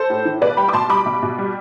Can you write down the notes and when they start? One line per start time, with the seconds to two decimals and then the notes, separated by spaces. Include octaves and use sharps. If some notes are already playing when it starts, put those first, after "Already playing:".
Already playing: A4 C5
0.10 A2
0.25 E3
0.42 B2 B4 D5
0.57 G3 G5 B5
0.69 D6
0.73 B2 A5 C6
0.90 G3 B5 D6
1.06 B2
1.22 B2
1.38 G3